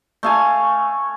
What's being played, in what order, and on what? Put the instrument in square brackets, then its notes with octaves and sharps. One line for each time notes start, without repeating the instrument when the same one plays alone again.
[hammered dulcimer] A3 F5 G#5